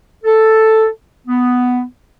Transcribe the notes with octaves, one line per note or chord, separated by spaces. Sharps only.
A4
B3